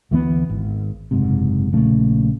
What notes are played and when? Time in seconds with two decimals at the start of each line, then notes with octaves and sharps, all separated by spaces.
0.11 D2 E3 G#3 B3
0.49 G#1
1.11 F#1 G#2 C3
1.73 A#1 A#2 C#3 A3